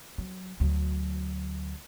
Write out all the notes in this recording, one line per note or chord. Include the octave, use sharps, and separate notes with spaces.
F#3
D2 F#3